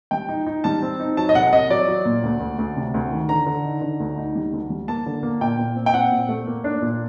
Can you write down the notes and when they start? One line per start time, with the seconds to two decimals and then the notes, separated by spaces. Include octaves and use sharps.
0.11 G3 G5
0.29 D#4
0.47 D#4
0.64 G3 A5
0.82 C4
1.00 D#4
1.17 F#3 A5
1.29 D#5
1.35 C2 F#5
1.52 C2 D#5
1.70 F#3 D5
1.87 F#3
2.05 A#2
2.23 D2
2.40 D2
2.59 D2
2.76 C3
2.94 D2
3.11 D#3
3.29 D3 A#5
3.46 D3
3.65 D#4
3.82 D3
4.00 D2
4.18 D#4
4.36 G3
4.53 D2
4.70 G3
4.88 A#3 A5
5.06 D3
5.23 A#3
5.41 A#2 G5
5.59 A#2
5.76 C4
5.86 G5
5.94 C4 F#5
6.12 A#2
6.29 A3
6.47 A#3
6.64 D4
6.82 A#2